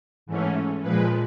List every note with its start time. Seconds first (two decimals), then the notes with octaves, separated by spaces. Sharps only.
0.26 G#2 E3 A3 C#4
0.82 A#2 F3 G#3 B4